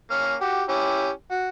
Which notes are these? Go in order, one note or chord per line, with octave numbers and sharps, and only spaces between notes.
A#3 C#4 F6
F#4 G4
C#4 E4 G4
F#4